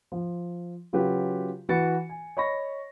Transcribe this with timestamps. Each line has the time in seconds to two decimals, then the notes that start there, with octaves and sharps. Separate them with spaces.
0.12 F3
0.93 C#3 F#3 F4 G4 B4
1.69 E3 F#4 B4 A6 C#7
2.09 G#5
2.37 C#5 D#5 B5 C#6 A#6